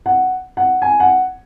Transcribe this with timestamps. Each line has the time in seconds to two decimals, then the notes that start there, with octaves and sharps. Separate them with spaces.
0.06 F#5
0.57 F#5
0.82 G#5
1.00 F#5